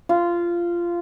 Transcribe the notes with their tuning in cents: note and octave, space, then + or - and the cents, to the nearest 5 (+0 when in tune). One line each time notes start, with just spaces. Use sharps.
F4 -15